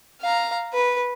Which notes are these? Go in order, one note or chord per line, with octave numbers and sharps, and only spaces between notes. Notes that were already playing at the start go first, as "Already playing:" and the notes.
F5 A#5
B4